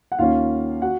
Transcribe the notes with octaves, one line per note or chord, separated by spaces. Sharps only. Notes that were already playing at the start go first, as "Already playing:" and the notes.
F#5
D#2 D#3 A#3 C#4 F4 F5
F#4 F#5